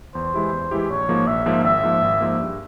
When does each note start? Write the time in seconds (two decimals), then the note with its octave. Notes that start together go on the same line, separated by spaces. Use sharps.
0.15 E2 C5
0.34 E3 G#3 E4 G4
0.53 E2
0.71 E3 G#3 E4 G4
0.90 A#1 C#5
1.09 G#2 F3 A#3
1.27 A#1 E5
1.46 G#2 F3 A#3
1.64 G#1 E5
1.83 G#2 F3 A#3
2.02 G#1
2.21 G#2 F3 A#3
2.40 G2